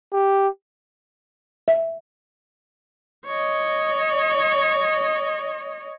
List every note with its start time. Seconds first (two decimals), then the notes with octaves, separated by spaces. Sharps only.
0.13 G4
1.68 E5
3.26 C#5 D#5